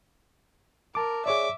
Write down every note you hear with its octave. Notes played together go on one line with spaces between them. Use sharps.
A#4 A5 D6
G#4 C#5 D5 E5 D6